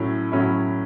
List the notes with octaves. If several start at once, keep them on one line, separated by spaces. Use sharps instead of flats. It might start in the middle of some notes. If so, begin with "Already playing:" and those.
Already playing: A2 F#3 C#4 E4
A2 F#3 C#4 E4